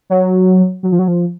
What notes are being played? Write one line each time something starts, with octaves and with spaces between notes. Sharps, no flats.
F#3
F#3
F3
F#3
F3